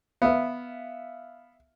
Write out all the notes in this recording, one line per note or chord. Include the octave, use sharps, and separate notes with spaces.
B3 E5 F5